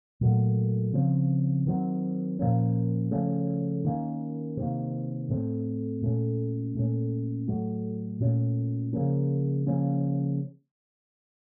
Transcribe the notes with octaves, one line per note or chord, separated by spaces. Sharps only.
A#2 F#3 A3
C#3 F3 C4
D#3 F#3 C4
A#2 F3 A#3 C#4
C#3 F3 A3 C#4
D#3 A#3 C#4
C3 D#3 A#3
A2 A3 C4
A#2 A3 C#4
A#2 A3 C#4
A2 F#3 A3
A#2 A3 C#4
C#3 F3 A#3 C#4
C#3 F3 A#3 C#4